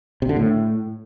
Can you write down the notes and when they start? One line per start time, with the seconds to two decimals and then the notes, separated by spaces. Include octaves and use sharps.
0.22 C3
0.29 D3
0.36 A2